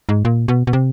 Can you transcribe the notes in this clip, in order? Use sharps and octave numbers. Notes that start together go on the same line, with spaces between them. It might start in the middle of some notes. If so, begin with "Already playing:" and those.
G#2
A#2
B2
B2
C3